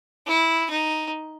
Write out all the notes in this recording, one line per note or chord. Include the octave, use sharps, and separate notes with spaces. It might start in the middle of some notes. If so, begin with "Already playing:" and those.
E4
D#4